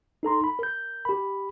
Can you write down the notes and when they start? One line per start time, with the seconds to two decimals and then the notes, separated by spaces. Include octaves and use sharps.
0.23 D#4 A4 A#5 C6
0.44 B5
0.59 A#4 G6
1.05 G4 B5